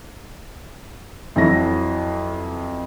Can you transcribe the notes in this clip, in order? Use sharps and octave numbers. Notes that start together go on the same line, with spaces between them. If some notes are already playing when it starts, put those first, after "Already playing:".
F2 E3 F#3 E4 A#6